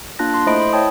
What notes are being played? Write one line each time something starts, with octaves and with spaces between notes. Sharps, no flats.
A#3 D4 F4 A5 F#6 A#6
C6
A3 E4 C5 D#5 B5 D7
B5
E4 C#5 G5 A5 D#6